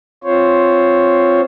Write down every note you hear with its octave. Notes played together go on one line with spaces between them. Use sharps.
C4 F4 C5 C#5